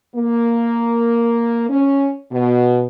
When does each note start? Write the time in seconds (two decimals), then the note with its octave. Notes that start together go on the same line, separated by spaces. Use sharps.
0.16 A#3
1.70 C#4
2.32 B2